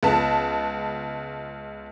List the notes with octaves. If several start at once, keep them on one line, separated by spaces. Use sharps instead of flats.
C#2 B3 A5